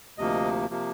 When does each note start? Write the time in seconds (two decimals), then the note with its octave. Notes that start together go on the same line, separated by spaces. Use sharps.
0.18 D2 C3 F3 A#3 D#5
0.70 C3 F3 A#3